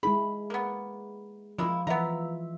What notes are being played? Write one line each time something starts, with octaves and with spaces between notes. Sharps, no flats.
G#3 E4 G#4 B5
A#3 B3
F3 G#3 A#3 E4 F4
E3 B3 E5 A#5